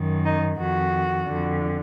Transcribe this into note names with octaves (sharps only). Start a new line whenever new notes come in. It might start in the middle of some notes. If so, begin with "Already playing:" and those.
Already playing: F#2 D#3
D#4
F2 D#3 F#4
F2 D3